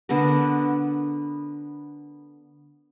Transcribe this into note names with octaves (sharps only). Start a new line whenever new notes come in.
D3 B3 A4 A#4